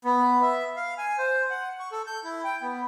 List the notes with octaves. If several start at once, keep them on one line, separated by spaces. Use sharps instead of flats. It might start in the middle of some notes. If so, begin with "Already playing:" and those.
B3
E5
F5
G#5
C5
F#5
C#6
A4
G6
E4
G5
B3